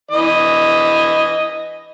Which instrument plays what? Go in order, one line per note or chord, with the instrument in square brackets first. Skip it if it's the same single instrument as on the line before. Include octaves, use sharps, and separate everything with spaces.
[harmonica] E3 D#5